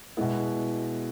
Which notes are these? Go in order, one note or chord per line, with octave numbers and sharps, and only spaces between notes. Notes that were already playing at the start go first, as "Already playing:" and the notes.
B2 G#3 B3 E4